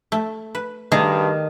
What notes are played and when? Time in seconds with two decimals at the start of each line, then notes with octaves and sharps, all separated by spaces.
0.12 A3
0.55 B4
0.92 G2 D#3 A3 G#4 A#5